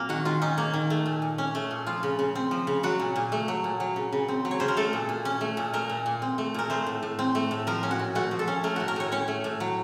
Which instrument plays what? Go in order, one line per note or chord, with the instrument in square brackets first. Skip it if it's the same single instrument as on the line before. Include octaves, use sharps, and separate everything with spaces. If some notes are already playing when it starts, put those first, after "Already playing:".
Already playing: [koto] A#2 F#3 A#3 C4 A#4
D#3 F#4
D#3 F4
C#4 D#4
A#3
D#3
A3
A#2
A#2
C#4
A3
A#2
F3 F4
C#3
C#3
C4
F3
C#3
F#3 F#4
A#2
A#2
A3
F#3
A#2
F#3
C#3
C#3
C4
F#3
C#5
C#3 C5
A#4
A3 A4
A#2
A#2
C#4
A3
A#2
A3 A#4
A#2
A#2
C4
A3
A#2 A#4
A3 C5
A2
A2
C4
A3
A2
F3 A#4
C#4
F#4
A#2
A3 F#4
F3
A4
C#4
A3 A#4
A2 F#4
A#4
A2 C#5
C#4 C#5
A3
A2
F#3